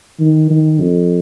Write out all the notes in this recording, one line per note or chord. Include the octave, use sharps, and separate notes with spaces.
D#3
D#3
F2